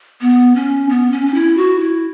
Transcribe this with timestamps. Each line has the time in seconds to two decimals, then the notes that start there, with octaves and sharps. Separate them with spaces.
0.21 B3
0.55 C#4
0.89 B3
1.11 C#4
1.26 C#4
1.34 E4
1.57 F#4
1.80 E4